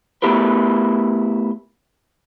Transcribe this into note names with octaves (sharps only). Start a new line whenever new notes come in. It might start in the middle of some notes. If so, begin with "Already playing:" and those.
A3 B3 E4 G4 A#4 B4